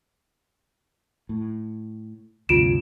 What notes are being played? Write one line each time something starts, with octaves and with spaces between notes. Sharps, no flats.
A2
D2 G2 C3 F4 D7 E7